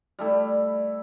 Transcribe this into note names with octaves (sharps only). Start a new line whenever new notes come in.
G3 A3 E4